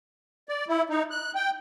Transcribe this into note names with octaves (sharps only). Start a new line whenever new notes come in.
D5
E4
D#4
F#6
G5